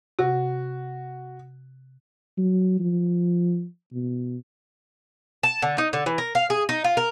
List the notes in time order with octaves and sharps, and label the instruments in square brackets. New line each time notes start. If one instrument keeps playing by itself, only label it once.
[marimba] C3 [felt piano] F#4
[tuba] F#3
F3
B2
[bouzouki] A5
D3
D#4
D3
E3
A#4
F5
G#4
D#4
F4
A#4